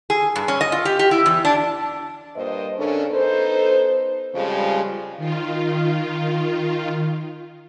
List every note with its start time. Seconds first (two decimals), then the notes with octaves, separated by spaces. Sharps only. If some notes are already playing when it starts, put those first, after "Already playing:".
0.10 G#4
0.36 G2
0.48 C#4
0.61 D#5
0.72 F4
0.85 G4
0.99 G4
1.11 E4
1.26 E2
1.45 D4
2.36 G2 A#2 C5 D#5
2.78 C#3 C#4 D4 A4 A#4
3.11 B3 D#4 A4 C5
4.35 F2 C#3 F3 G3 G#3
5.17 D#3 F4